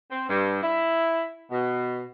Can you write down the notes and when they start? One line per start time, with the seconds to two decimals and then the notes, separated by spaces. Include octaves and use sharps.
0.11 C4
0.29 G2
0.63 E4
1.51 B2